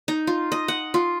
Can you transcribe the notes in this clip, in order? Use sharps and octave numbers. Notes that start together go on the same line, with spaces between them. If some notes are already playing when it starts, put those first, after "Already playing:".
D#4
F4
D#5
F#5
F4